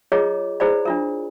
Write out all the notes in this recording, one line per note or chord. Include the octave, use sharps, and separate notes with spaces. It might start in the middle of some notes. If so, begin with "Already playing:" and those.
F4 G#4 C#5 D#5 A#5 D6
E4 G#4 C5 D5 B5
D4 F4 A#4